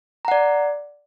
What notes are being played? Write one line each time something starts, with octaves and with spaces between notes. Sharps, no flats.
D5 F#5 A#5